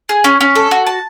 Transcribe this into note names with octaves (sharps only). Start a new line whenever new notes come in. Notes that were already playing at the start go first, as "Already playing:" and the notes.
G#4
C#4
C#4
A4
F#4
A5